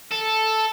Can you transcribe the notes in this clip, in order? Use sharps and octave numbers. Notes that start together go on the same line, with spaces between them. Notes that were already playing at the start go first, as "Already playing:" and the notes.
A4